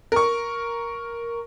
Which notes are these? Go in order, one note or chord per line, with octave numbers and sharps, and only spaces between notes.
A#4 C#6